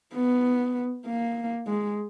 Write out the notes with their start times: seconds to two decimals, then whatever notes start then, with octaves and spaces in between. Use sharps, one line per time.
0.14 B3
1.06 A#3
1.67 G#3